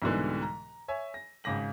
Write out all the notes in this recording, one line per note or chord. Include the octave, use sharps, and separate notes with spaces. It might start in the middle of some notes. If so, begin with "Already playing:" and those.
C2 G#2 B2 D3 E3
A#5
C#5 E5 G#5
A#6
G#1 C#3 D6 A#6 F#7